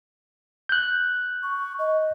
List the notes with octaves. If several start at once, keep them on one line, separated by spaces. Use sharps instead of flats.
F#6 G6
C#6
D#5